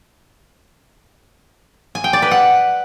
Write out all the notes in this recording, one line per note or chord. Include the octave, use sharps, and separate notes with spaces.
G#5
G5
D5
B4
F#5